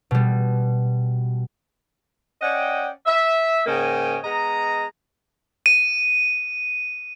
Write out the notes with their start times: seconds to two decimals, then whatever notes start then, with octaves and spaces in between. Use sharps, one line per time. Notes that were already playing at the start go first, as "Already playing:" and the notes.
0.11 B2 G3
2.42 C#4 D5 D#5 F#5 G5
3.05 E5
3.66 G#2 C#3 A#3 D#5 G5 G#5
4.24 G#3 B3 D#5 A#5
5.66 D#7